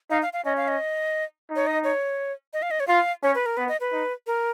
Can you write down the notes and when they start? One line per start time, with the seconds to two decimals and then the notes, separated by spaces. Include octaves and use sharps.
0.11 D#4 F5
0.22 F5
0.33 F5
0.45 C#4 D#5
0.57 F5
0.68 D#5
1.50 D#4
1.56 C#5
1.67 D#5
1.84 C#5
2.53 D#5
2.62 F5
2.71 D#5
2.80 C#5
2.88 F4 F5
3.23 C#4 C#5
3.35 B4
3.46 A#4
3.57 B3 B4
3.69 D#5
3.80 B4
3.92 D#4
4.27 A#4